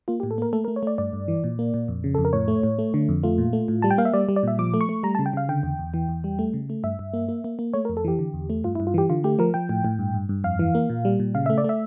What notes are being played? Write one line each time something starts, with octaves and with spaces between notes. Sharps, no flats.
A#3 F4
G4
A2
A4
A#3 A#4
A3 A4
A#4
A3
C#5
A3 D5
G2 D5
G2
E3
A#2
A#3
A#2
F2
C#3
F2 A4
A#4
A2 C#5
A3
A2
A3
D3
F2
A3 F4
A#2
A3
A2
G3 A5
G5
A#3 F5
E5
G3 D5
G3
D5
A#2 E5
F3 D6
A3
C#6
A3
G3 A#5
A5
C#3
G5
C#3 F5
D3 G5
E2
E2
E3
E2
G3
A3
C#3
A3
G2 E5
G2
A#3
A#3
A#3
A#3
A3 C#5
A#4
F2
A4
E3 G4
D3
E2
A3
G2 F4
E4
G2
F4
E3 G4
D3 F4
A3 G4
F3 A#4
F3 G5
A2
A2
G2
G2
G2
F2 F5
E3
A#3
A#2
G3
A#2
C#3 F5
A3 E5
D5
A3 E5